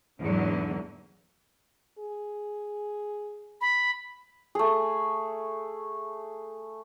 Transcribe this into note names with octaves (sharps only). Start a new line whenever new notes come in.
E2 G#2 D3 F#3
G#4
B5
A3 G#4